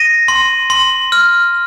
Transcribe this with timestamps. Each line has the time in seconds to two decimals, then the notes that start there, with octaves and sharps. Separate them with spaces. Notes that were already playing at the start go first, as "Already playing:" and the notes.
Already playing: A#6 D#7
0.28 C6
0.70 C6
1.12 F6